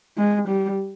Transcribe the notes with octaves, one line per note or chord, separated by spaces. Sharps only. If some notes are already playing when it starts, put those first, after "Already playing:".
G#3
G3